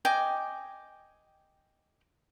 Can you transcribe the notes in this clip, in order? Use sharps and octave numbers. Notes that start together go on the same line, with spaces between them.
D#5 G5 G#5 D6